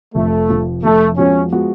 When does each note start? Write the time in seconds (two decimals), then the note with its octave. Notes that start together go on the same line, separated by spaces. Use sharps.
0.15 F1 F2 F3 A3
0.49 F1 F2 F3
0.83 F1 F2 F3 A3
1.17 F2 F3 G#3 B3 C#4 F#4
1.52 F3 G#3 B3 F#4